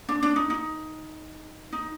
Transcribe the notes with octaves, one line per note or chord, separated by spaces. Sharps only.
D4
D4
D#4
D#4
D#4